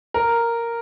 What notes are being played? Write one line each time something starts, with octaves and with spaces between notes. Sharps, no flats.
A#4